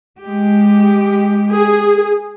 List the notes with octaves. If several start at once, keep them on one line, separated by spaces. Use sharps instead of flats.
G#3 G4
G#4